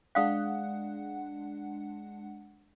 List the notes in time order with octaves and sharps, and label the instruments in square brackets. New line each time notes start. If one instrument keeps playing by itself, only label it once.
[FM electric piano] G#3 D4 F#5 [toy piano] F5 D#6